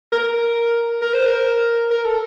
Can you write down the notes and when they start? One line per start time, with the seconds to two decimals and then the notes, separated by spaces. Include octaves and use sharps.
0.12 A#4
1.01 A#4
1.13 C5
1.26 A#4
1.90 A#4
2.05 A4